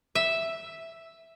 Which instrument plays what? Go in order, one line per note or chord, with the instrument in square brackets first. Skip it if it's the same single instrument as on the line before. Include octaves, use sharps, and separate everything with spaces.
[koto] E5